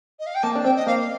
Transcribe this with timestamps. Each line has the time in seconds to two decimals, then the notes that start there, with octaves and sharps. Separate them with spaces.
0.19 D#5
0.26 F5
0.35 G5
0.43 A#3 A5
0.55 D4
0.64 C4 G5
0.76 D#5
0.87 A#3 F5